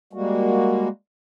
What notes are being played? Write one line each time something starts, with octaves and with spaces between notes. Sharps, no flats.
G3 G#3 A#3 F#4